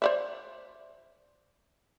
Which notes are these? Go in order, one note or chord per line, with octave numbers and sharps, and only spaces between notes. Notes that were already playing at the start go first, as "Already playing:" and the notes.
C5 D5 E5